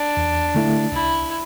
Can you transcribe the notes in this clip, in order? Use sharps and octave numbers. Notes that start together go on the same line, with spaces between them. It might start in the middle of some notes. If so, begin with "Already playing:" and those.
Already playing: D4
E2
D3 A3 E4
C2 E4